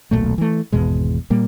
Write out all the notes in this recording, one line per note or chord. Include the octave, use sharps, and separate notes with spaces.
D#1 B1 A#2 A3
E3 A3
G#1 E2 B2 G#3
A#2 G3 A#3